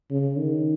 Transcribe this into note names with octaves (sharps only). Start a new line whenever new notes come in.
C#3
D#3